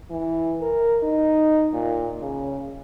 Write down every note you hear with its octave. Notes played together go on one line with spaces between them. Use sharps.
E3
A#4
D#4
A#2
C#3